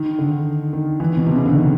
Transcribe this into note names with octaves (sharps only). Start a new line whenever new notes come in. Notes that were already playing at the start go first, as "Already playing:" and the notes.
Already playing: D#3
D3
D#3
E3
B2
C3
C#3
D3
D#3